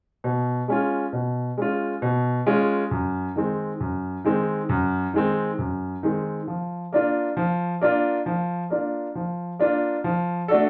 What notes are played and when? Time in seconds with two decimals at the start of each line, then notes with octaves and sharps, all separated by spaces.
0.24 B2
0.68 G#3 C#4 F4
1.13 B2
1.57 G#3 C#4 F4
2.02 B2
2.47 G#3 C#4 F4
2.91 F#2
3.36 D#3 G#3 C4
3.80 F#2
4.24 D#3 G#3 C4
4.69 F#2
5.13 D#3 G#3 C4
5.58 F#2
6.03 D#3 G#3 C4
6.48 F3
6.93 A#3 D4 F4
7.37 F3
7.81 A#3 D4 F4
8.26 F3
8.70 A#3 D4 F4
9.15 F3
9.59 A#3 D4 F4
10.04 F3
10.48 A3 D4 F#4 A4